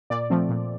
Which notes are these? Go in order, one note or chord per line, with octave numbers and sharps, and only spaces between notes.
A#2 D5
F3 A3 C4
A#2